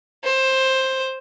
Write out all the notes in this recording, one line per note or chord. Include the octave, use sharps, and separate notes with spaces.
C5